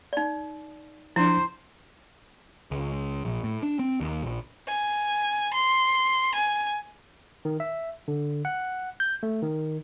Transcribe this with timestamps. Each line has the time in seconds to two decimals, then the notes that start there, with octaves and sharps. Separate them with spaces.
0.13 D#4 D5
1.16 F3 D4 E4 C5
2.71 C#2
3.25 A#1
3.44 A2
3.63 D4
3.79 C4
4.01 D#2
4.23 A#1
4.67 G#5
5.54 C6
6.35 G#5
7.45 D#3
7.60 E5
8.08 D3
8.45 F#5
9.00 G6
9.23 A3
9.42 D#3